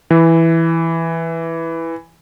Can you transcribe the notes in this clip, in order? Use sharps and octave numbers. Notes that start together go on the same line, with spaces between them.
E3